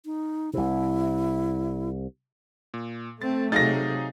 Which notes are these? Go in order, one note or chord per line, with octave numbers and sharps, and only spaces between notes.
D#4
C2 C3 E4
A#2
A3 C4 A6
C3 F#3 D#4 G#4 F5 A6 A#6